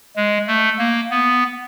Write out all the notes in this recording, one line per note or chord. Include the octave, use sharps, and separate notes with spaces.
G#3
A3
A#3
B3